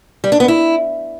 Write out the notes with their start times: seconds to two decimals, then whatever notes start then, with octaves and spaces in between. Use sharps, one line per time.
0.24 G3
0.32 D4
0.40 B3
0.48 E4